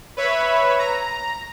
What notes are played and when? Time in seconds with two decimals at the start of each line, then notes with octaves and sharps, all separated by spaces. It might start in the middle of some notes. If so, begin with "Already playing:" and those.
0.17 B4 C#5 E5 B5
0.79 A#5